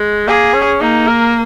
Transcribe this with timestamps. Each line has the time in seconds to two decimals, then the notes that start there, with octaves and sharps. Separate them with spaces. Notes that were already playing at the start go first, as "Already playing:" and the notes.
Already playing: G#3
0.27 A#3 G#4
0.54 C#4
0.81 A#3 D#4
1.08 A#4